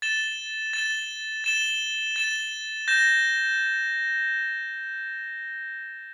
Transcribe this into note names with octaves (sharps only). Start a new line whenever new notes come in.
A6 E7 G7
A6 E7 G7
A6 E7 G7
A6 E7 G7
G6 A#6 E7